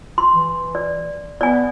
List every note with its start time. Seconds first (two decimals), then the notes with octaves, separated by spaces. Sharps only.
0.18 C6
0.33 E3
0.75 D5
1.41 B3 D5 G#5